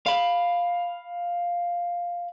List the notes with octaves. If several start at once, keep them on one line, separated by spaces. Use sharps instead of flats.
F5 B5